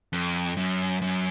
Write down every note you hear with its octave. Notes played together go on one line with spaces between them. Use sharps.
F2
F#2
F#2